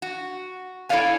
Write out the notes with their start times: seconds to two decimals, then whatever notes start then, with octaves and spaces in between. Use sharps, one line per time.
0.02 F#4
0.89 E4 A4 C#5 D5 F5 G#5